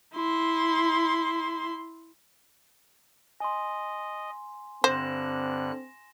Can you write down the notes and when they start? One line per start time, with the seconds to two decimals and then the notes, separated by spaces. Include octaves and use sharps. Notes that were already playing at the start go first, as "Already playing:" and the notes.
0.15 E4 C6
3.40 D#5 G#5 C6
4.84 G2 D3 C4 C5 F#6 A#6 E7